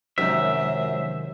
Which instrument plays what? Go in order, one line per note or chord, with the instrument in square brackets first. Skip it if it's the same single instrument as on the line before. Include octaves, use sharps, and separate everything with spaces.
[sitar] F#2 [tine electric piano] C3 D#3 F#3 [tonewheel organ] F3 G#3 C5 [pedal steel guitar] E5